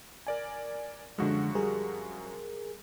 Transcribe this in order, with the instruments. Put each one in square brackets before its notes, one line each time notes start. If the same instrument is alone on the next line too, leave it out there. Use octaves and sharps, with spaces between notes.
[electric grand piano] A#4 D5 G#5
[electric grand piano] F#2 F3 F#4 [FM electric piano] D3 G#3
[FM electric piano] G3 G#4 A#4